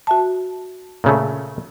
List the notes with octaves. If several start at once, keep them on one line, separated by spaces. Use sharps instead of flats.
F#4 E5 A5
A#2 C#3 A3